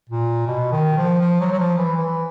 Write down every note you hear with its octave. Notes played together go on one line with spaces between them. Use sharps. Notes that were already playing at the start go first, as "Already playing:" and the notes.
A#2
B2
D#3
F3
F3
F#3
F#3
F3
E3
E3